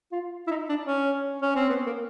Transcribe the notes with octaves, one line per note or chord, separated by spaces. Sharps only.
F4
E4
D#4
D4
C#4
C#4
C4
B3
A#3